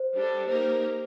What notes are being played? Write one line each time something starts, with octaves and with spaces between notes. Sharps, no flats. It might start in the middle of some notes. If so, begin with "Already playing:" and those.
Already playing: C5
G3 D4 A4
A#3 D#4 G4 A#4 C5